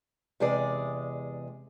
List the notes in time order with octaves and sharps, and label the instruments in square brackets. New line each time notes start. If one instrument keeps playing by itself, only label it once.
[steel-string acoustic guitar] E2 C3 G#3 G#4 D5